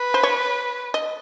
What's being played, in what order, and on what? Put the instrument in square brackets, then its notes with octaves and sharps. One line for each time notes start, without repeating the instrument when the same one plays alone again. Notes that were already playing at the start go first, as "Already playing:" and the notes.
Already playing: [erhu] B4
[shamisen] C5
C#5
D#5